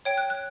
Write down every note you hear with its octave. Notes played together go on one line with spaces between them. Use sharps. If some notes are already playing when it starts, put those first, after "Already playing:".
C#5 G5
F#6
F#6